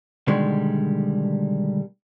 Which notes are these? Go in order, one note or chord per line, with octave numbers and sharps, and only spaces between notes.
B2 D3 D#3 G3 G#3